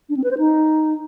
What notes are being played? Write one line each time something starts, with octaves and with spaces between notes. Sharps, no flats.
D4
C4
B4
C5
D#4